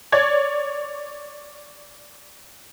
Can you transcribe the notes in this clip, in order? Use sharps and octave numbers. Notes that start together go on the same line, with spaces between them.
C#5 D5 G#6